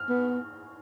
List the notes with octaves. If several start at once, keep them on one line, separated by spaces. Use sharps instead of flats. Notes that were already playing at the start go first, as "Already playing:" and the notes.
Already playing: F6
B3